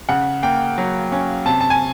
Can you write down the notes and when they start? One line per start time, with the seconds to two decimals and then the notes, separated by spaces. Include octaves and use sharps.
0.09 C#3 F#5
0.43 A#3 G5
0.78 F#3
1.12 C#4
1.46 C3 A5
1.61 A5
1.70 G#5